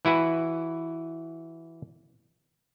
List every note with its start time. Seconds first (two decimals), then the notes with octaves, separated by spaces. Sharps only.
0.05 E3 E4 F#4 B4